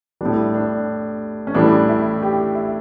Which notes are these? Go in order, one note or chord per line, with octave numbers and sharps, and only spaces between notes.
A2 G3 D4
D4
C#4
A2 E3 G3 D4
E4
G4
E5